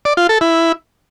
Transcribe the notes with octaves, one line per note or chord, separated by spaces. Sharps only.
D5
F4
A4
E4